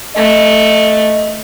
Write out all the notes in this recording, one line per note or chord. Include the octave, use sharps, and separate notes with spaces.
A3 D#5